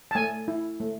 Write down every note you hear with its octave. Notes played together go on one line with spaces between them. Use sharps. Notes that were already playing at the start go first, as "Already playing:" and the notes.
A5
A3 G#5
E4
A3